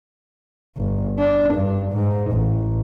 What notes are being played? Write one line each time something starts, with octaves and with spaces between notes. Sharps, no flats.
G1
D4
G2
G#2
A1